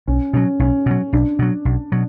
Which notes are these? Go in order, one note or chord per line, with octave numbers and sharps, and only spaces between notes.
B1 C#4
B2 F#3 C#4
B1 C#4
B2 F#3
B1 D4
B2 F#3
B1
B2 F#3